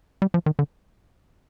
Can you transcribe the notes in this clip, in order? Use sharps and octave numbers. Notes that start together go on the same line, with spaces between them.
G3
F3
D#3
D3